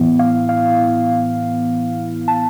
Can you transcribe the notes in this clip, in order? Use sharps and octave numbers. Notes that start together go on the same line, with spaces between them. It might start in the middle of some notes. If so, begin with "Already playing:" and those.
Already playing: A2 E3 B3 E4
F5
F5
A5